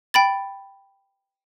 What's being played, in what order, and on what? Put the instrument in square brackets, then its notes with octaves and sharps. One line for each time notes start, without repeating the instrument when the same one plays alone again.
[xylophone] G5 B5 A6